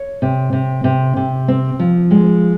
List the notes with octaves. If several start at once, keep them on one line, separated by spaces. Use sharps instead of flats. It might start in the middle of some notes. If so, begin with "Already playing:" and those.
Already playing: C#5
C3
C3
C3
C3
C4
F3
G#3